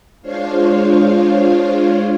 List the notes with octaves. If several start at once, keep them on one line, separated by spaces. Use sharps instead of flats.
G#3 D4 F4 C5 C#5 F5